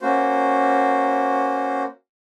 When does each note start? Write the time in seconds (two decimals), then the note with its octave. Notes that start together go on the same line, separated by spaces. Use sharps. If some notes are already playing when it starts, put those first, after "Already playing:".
0.02 A#3 C#4 F#4 C5